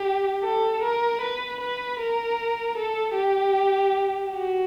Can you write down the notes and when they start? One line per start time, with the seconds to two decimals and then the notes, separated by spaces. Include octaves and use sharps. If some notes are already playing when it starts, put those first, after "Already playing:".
Already playing: G4
0.43 A4
0.83 A#4
1.22 B4
1.61 B4
2.00 A#4
2.78 A4
3.16 G4
4.33 F#4